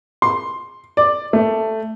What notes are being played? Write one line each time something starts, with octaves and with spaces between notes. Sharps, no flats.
C6
D5
A3